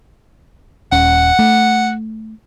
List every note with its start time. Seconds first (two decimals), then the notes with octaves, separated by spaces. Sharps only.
0.92 D#1 C#4 F#5
1.39 A3